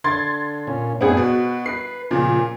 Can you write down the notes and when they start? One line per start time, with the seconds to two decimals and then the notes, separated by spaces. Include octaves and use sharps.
0.04 D3 C6 G#6 A6
0.67 A#2 C#4
1.01 F#2 A2 B3 C4 D4 G#4
1.17 B2 F#4
1.66 B4 C7
2.11 A#2 C#3 F3